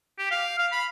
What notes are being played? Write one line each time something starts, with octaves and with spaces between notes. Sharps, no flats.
G4
F5
F5
B5